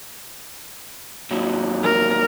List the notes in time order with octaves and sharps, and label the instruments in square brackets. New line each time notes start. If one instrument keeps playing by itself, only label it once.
[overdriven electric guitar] D#2 F#3
[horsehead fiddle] A#4